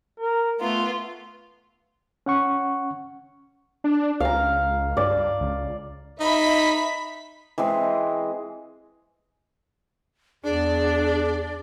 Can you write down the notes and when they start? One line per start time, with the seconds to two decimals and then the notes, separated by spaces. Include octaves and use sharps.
0.20 A#4
0.60 A3 B3 F4
2.26 C#4 F#5 C#6
3.84 D4
4.20 C#2 F5 A#5
4.97 G2 D5
5.41 C#2
6.20 D#4 E5 B5 B6
7.58 E3 G#3 C4 G#4
10.44 E2 D4 G#4 D5